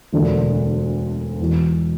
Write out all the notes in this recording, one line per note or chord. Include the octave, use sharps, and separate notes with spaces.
E1 D2 D3 A#3 D4
E1 E2 B2